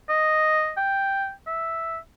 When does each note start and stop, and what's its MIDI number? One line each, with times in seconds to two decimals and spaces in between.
0.09 0.72 75
0.77 1.32 79
1.47 1.98 76